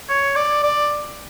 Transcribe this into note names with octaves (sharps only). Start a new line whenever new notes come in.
C#5
D5
D5